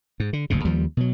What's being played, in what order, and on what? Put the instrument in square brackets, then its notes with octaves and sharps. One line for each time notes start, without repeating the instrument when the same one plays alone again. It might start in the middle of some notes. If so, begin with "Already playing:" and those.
[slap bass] G#2
D3
F#1 D2 G2 C3
D#2 F3 G3
B2 F#3